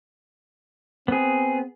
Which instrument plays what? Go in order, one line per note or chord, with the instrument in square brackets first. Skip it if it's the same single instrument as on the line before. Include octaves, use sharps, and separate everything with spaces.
[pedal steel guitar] B3 G#4 [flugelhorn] C4